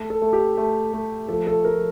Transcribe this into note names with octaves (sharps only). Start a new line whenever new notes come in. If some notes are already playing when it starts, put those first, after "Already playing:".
Already playing: A3 A4
A4
A3
G4
A3
A3
F3 A4
A4
F3 A#4